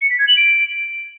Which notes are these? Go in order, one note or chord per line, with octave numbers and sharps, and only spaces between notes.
C#7
B6
G#6
F#7
D7